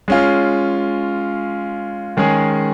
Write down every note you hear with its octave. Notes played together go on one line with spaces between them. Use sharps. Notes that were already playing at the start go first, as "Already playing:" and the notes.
G#3 C#4 F4
D#3 G#3 C#4 G#4